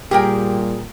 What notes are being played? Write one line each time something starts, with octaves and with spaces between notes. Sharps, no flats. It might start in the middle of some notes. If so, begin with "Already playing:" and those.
A#2 G3 G4 G#4 A#4 G5